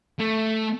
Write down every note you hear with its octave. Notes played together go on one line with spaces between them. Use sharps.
A3